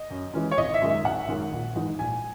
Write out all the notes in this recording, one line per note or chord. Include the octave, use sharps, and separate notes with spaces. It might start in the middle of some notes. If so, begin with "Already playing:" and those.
Already playing: D#5
F#2
E3 G#3 C#4
C#5
G#1 D#5
E5
F#2 D#3 G#3 C#4
E5
G#1 F#5
F#2 D#3 G#3 C#4
A#1
G#2 E3 G#3 D#4
A#1 G#5